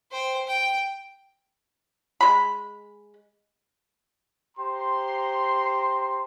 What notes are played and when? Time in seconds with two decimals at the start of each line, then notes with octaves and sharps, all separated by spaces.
0.12 C5 G5
0.47 G5
2.21 G#3 B5
4.58 G4 C5 A#5 C6